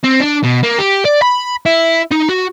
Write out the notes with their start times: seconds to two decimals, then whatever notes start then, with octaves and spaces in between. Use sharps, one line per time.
0.04 C4
0.20 D4
0.43 B2
0.63 A#3
0.78 G4
1.05 D5
1.22 B5
1.66 E4
2.11 D#4
2.29 F#4